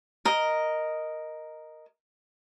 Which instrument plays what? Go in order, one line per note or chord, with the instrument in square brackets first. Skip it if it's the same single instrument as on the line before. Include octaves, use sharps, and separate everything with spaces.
[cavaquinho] A#4 D#5